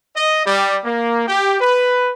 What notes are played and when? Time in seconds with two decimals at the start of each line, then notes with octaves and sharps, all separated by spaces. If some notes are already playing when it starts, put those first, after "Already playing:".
0.15 D#5
0.45 G3
0.83 A#3
1.27 G4
1.58 B4